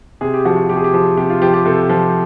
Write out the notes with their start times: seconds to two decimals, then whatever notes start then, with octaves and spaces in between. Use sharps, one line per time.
0.21 C3 G#4
0.34 G4
0.45 F3 F#4
0.57 F#4
0.69 C3 G4
0.77 G#4
0.84 G4
0.94 F3
1.17 C3 G4
1.29 F4
1.42 F3 G4
1.54 G4
1.65 C3 A4
1.89 F3